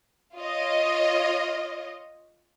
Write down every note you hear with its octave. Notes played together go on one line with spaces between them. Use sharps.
F4 C#5 D#5